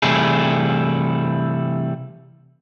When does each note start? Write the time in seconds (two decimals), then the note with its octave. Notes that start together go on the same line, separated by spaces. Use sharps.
0.02 C3 E3 G3 A3 E4 G#4